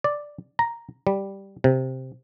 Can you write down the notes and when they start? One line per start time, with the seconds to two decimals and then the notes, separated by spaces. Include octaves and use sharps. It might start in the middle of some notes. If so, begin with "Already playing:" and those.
0.04 D5
0.59 A#5
1.07 G3
1.64 C3